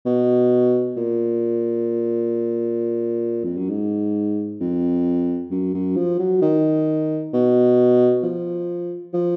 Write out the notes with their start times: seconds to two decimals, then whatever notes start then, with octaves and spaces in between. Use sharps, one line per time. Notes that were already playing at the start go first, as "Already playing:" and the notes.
0.06 B2
0.97 A#2
3.44 F2
3.57 F#2
3.70 G#2
4.61 F2
5.51 F#2
5.74 F#2
5.97 F3
6.20 F#3
6.42 D#3
7.33 B2
8.23 F3
9.14 F3